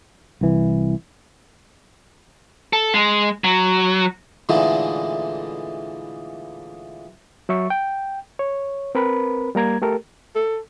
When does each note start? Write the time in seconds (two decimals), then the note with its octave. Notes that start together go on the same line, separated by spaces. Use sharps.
0.41 C2 E3
2.73 A4
2.94 G#3
3.44 F#3
4.49 A#2 D3 E3 G#3 A3 D#4
7.49 F#3 E5 C#6
7.70 G5
8.39 C#5
8.95 C4 A#4 B4 B5
9.55 G3 A#3 A#5 G#6
9.82 A3 G4 A4 A#4
10.36 A4